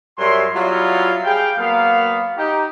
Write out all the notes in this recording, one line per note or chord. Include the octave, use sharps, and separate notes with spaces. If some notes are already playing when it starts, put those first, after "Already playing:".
F#2 G3 E5 C6
F#3 G3 B3 E4 F4
G3 G#4 F5 G5
F#3 A#3 B3 F5
D#4 G4